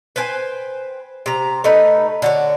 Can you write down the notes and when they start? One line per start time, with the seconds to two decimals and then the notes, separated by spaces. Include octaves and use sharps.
0.16 B4 C5 G5 G#5
1.26 C3 A#5
1.64 A3 D#4 B4
2.22 D3 F#4 C#5